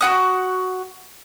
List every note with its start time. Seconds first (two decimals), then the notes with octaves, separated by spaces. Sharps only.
0.01 F#4 F#5 D#6